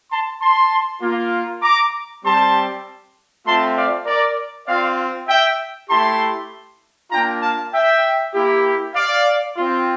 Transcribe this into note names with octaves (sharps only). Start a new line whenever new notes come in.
A5 C6
A5 C6
A#3 F4
A#5 D6
G3 C4 G4 A5 C6
A3 C4 F4 A5 C6
D5 F5
A#4 D5
C4 F4 D5 F5
E5 G5
A3 E4 G4 A5 C6
A#3 D4 F4 G5 A#5
F5 A5
E5 G5
A#3 E4 G4
D5 F5
C4 F4